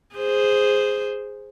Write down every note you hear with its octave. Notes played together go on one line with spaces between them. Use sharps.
G#4 C5